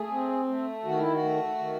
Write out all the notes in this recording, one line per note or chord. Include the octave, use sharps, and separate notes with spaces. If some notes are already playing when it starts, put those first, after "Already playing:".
Already playing: A3 G#4
C4
A3
D#3 F#4
E4
F#4
A3
D#3